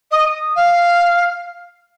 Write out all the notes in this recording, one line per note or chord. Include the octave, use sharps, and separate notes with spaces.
D#5
F5